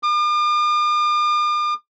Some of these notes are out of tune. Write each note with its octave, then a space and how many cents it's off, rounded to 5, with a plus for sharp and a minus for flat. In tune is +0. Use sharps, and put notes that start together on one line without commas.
D6 +45